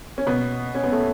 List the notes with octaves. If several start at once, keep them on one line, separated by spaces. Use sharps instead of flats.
C#4
B2 B3
C#4
B3
A3